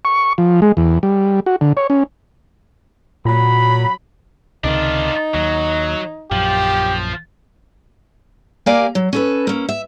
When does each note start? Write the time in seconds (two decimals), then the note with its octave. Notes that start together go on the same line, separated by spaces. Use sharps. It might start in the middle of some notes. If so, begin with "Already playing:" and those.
0.05 C#6
0.38 F3
0.62 G#3
0.77 E2
1.03 G3
1.46 F#4
1.61 D3
1.77 C#5
1.90 C#4
3.25 A#2 F#3 B5
4.64 C#2 C3 D#3 D4 D#4 F4
5.35 D#2 F#3
6.31 A#1 F#2 F3 G4
8.66 A#3 G4 A#4 D5 F5 G#5
8.95 F#3
9.13 C#4 A4 B4
9.47 A#3 C#4
9.69 E5